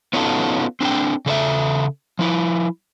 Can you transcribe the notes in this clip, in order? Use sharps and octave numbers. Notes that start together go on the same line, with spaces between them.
B3 C#4 D#4 F4 F#4 A4
C4 D4 G4 A4 G5
C#3 A4 D5 E5
F3 E4